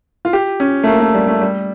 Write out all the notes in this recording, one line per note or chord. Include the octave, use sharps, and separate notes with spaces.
F4
G4
C#4
A3
A#3
A3
G3
A3
G3